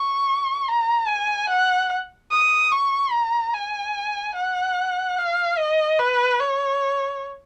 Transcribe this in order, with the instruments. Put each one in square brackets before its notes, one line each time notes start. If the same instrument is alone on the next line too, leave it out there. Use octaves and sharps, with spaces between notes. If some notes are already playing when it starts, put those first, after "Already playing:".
Already playing: [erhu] C#6
A#5
G#5
F#5
D#6
C#6
A#5
G#5
F#5
F5
D#5
B4
C#5